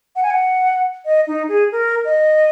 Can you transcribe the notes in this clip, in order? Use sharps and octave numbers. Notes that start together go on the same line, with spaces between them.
F#5
G#5
F#5
D#5
D#4
G#4
A#4
D#5